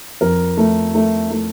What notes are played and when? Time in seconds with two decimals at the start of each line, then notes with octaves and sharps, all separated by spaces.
0.21 F2 A#4
0.57 A3
0.95 A3
1.31 A3